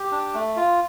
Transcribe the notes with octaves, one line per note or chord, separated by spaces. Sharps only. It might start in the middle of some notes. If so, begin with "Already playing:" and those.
Already playing: G4
D4
A3
F4